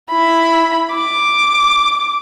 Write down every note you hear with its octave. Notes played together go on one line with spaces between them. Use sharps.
E4 B5
D6